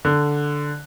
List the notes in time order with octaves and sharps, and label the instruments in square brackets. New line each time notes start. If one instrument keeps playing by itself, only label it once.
[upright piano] D3